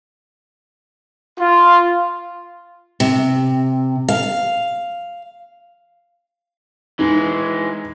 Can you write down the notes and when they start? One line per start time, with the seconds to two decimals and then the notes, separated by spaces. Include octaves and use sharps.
1.39 F4
3.00 C3
4.08 F5
6.99 E3 G#3 D#4